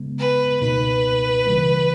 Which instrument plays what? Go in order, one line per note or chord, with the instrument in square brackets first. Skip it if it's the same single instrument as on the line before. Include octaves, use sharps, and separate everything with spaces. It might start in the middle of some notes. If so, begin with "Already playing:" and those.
Already playing: [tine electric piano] C#3 G#3 B3
[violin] B4
[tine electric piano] C#2 B2 A#3 D#4 [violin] B4
[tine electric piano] C#3 E3 G3 A#3